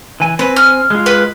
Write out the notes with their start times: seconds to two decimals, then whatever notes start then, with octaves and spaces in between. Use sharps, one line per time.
0.20 E3 G#5
0.39 C4 B4 G#5
0.56 F6
0.90 G#3 F4
1.06 B4